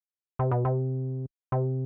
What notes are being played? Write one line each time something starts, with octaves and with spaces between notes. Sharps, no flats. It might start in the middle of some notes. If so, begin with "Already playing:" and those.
C3
B2
C3
C3